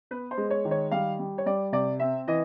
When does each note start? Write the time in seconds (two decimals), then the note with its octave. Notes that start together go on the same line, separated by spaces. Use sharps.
0.11 B3 B4
0.31 C5
0.38 G#3
0.50 C#5
0.65 D#3
0.71 C#5
0.91 G3 F5
1.19 G3
1.38 C#5
1.46 G3 D5
1.72 C3 D5
2.00 C4 E5
2.27 E3 D#5